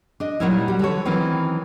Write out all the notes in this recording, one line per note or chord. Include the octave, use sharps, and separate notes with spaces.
D4 D#5
A#2 F#3 G3 C#4 D#4 E4
G3 F#4
D3 E3 A4 C#5
D#3 E3 F#3 C4 C#4